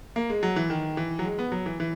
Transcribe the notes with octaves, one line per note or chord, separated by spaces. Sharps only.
A#3
G#3
F#3
E3
D#3
E3
F#3
G#3
B3
F#3
E3
E3